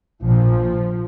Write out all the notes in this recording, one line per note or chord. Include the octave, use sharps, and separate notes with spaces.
A#1 A#2 F3